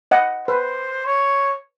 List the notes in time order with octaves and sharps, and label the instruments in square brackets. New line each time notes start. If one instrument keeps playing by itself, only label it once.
[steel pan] D#5 F#5
[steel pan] B4 [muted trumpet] C5
[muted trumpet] C#5